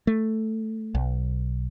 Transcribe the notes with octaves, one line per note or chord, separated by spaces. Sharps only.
A3
B1